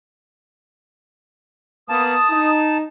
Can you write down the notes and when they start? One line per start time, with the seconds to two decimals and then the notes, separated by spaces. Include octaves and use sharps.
1.89 A#3 B3 A5 D#6
2.30 D#4